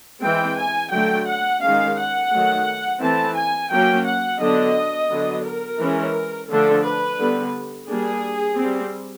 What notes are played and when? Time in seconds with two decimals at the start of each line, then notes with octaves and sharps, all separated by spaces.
0.22 E3 G#3 C4 G5
0.57 G#5
0.91 D3 F#3 A3 G5
1.27 F#5
1.61 D#3 G#3 C#4 F5
1.97 F#5
2.31 D#3 F#3 A3
3.00 E3 A3 C4 A5
3.36 G#5
3.70 F#3 A#3 C#4 G5
4.05 F#5
4.40 D3 F#3 B3 D4 D#5
5.10 D3 F#3 B3
5.45 A#4
5.79 E3 G#3 C#4
6.49 D3 F3 A3 D4 A4
6.84 B4
7.18 D3 G3 B3
7.88 G3 A#3 D4 G#4
8.58 G3 C4